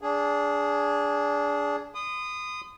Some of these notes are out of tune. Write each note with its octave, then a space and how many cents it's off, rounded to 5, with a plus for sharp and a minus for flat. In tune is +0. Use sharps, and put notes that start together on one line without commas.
D4 -20 G#4 +0
C6 -45 D#6 -15